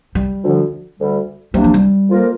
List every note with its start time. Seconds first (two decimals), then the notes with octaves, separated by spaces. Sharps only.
0.15 G3
0.42 D2 D3 F3
0.98 D2 D3 G3
1.54 C3 G3 A#3 D4
1.64 F3
1.74 G3
2.09 F2 F3 A#3 F4 A#4